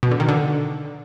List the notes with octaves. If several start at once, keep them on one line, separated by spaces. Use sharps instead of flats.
B2
D3
D#3
D3